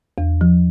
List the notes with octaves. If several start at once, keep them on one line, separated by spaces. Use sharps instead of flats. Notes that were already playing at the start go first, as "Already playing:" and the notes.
E2
F3